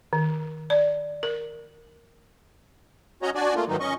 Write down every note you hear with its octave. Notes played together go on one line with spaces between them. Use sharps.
D#3
D5
A#4
C#4 F#4 C#5 D#5 A#5
D4 F#4 D5 G#5
A3 A#3 F4
G#2 D#3 E3 F#3 D#4
C#4 D#5 C#6